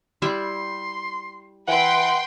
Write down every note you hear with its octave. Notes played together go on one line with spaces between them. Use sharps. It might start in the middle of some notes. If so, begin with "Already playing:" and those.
G3 E4 E5 C6
E3 B4 F#5 G5 C6